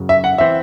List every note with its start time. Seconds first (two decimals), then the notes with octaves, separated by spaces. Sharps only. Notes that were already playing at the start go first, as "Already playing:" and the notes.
Already playing: F#2 C#3 F#3
0.09 E5
0.24 F#5
0.38 E3 C4 E5